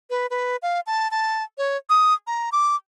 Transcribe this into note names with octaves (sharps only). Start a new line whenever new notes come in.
B4
B4
F5
A5
A5
C#5
D#6
A#5
D6